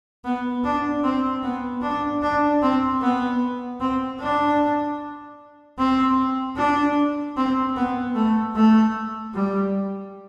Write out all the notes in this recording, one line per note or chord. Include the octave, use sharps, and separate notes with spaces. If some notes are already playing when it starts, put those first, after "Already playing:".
B3
D4
C4
B3
D4
D4
C4
B3
C4
D4
C4
D4
C4
B3
A3
A3
G3